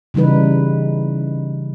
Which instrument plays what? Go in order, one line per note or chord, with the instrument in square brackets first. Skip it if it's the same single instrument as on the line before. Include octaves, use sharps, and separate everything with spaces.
[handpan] C#3 E3 G3 D#4 B4